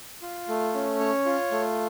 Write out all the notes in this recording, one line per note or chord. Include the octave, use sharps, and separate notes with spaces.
F4
A3
C#4
C#5
F4
A3